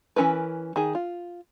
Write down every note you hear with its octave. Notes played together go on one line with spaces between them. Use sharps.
E3 F3 C#4 A#4 B4
D#3 G#4
F4